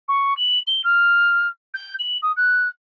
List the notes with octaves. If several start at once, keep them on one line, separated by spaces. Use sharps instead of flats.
C#6
F#7
G7
F6
G6
F#7
D#6
F#6